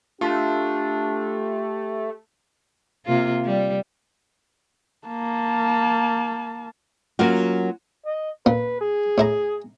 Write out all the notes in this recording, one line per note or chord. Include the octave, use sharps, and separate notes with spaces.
A3 D4 F4 G4
C3 A#3 F4
G3
A#3 A5
F#3 A#3 C#4 F4 F#4
D#5
A#2 A#3 B4
G#4
A2 E4 A#5